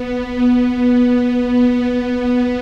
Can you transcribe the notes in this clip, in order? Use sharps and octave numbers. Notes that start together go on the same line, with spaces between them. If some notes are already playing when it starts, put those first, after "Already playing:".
Already playing: B3
B3